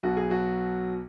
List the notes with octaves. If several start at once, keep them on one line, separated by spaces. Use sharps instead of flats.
B1 B2 F#3 F#4
G#4
F#3 F#4